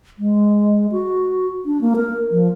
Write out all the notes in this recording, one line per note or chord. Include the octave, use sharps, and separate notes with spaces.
G#3
F#4
D4
A#3
A#4
F3